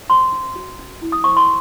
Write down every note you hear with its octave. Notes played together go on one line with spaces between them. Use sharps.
C5 C6
C#4
F#4
C#4
E4
D#6
C5 C#6
C6